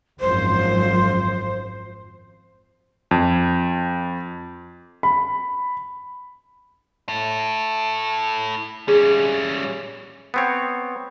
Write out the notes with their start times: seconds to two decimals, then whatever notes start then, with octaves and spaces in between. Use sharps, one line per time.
0.20 G#1 F#2 F3 C5
3.11 F2
5.03 B5
7.09 E4 A4
8.88 G3 C#4 G#4
10.34 B3 C4 C#5